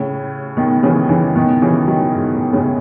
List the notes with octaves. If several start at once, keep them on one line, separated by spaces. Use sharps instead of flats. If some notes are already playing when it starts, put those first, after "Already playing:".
Already playing: A2 C#3
B2 D#3
C#3 E3
C#3 E3
B2 D#3
C#3 E3
D#3 F#3
G#2
A2
A2 C#3